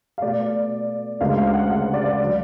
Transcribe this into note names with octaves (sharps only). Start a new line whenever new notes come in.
F5
B2 A3 D5
D2 C#3 G#3 F5
F5
F#5
F5
D5
F5
D3 F#3 D5